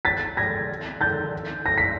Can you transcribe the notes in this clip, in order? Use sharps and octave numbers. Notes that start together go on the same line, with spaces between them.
A6 B6
G#6 A#6
G6 A6
A#6
B6